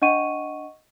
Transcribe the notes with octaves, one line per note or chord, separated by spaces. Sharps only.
D4 D#5 F#5 C#6 D#7